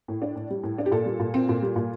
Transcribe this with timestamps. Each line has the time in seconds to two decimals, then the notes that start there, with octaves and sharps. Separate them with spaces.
0.08 A2
0.22 D4
0.36 A2
0.50 G3
0.63 A2
0.78 D4
0.86 G4
0.92 A#2 A4
1.06 G3
1.20 A#2
1.34 C4
1.49 A#2
1.62 G3
1.76 A#2